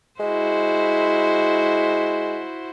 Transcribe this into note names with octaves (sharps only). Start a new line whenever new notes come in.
G#3 E4 F#4 C5